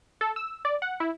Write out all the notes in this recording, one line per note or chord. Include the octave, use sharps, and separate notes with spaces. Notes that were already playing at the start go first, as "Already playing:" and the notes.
A4
E6
D5
F#5
E4